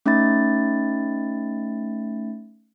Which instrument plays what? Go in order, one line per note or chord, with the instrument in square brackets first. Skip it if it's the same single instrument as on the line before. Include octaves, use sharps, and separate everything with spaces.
[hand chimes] A3 C#4 D#4 E5 B5 A6